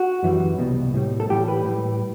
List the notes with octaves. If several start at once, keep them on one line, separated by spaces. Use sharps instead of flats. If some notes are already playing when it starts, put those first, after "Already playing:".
Already playing: F#4
F#2 E3 G3
C2 B2 G3
A2 G3
A4
A2 E3 G3 G4
B4
A2
G3